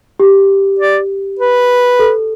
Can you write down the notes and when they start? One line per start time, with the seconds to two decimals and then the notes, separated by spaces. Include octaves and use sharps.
0.19 G4
0.79 D5
1.39 B4
1.99 A4